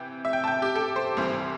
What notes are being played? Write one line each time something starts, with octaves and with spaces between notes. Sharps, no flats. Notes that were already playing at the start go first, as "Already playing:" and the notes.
Already playing: C3 E3 G5
E5
G5
A5
G5
G4
A4
C5
C2 C3 E3 G3 C5